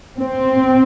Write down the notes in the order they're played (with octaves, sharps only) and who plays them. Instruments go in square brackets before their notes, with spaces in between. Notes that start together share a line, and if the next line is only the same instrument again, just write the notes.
[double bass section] C4